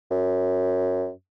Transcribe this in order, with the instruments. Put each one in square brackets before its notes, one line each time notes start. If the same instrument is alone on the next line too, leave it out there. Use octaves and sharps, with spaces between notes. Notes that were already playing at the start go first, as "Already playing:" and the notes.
[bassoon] F#2